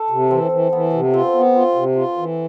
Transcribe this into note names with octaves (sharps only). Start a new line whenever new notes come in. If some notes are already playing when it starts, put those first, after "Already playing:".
Already playing: A4
C3
E3 C4
E3
E3 B3
C3
C4 F4
B3
F4
C3
F4
E3